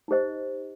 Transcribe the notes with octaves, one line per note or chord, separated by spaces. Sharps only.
D#4 G4 C5 D#5